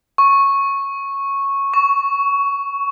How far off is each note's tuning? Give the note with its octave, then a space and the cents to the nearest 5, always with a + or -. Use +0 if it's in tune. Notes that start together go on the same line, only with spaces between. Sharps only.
C#6 -10
C#6 +15